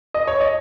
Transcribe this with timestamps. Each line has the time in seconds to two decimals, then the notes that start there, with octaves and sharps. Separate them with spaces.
0.14 D#5
0.27 C#5
0.40 D#5